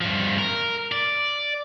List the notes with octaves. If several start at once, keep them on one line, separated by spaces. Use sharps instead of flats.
G2 F3
A#4
D5